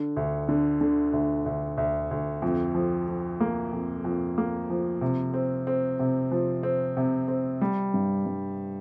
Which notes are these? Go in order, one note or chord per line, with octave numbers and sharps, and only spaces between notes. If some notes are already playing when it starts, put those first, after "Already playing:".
Already playing: D3
D2
D3
D3
D2
D2
D2
D2
F2
F3
F3
A#3
F2
F2
A#3
F3
C3
C4
C4
C3
F3
C4
C3
C4
G3
G2
G2